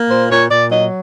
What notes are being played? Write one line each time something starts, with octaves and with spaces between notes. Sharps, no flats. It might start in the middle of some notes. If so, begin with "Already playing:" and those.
Already playing: A#3
A#2 C5
A#2 C#5
A#2 D5
F#3 D#5